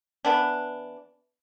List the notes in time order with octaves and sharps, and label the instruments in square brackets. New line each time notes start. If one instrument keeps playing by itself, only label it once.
[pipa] E3 B3 D4